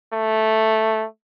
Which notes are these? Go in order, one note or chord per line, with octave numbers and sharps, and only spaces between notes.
A3